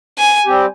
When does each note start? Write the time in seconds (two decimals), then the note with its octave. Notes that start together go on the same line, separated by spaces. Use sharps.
0.18 G#5
0.46 G3 C4 G4